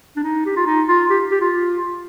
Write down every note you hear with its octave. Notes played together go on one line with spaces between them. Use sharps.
D4
D#4
G4
F4
D#4
F4
G4
G4
F4